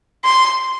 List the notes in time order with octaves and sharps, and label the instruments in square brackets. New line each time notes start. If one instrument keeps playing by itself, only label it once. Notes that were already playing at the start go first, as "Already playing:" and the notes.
[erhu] C6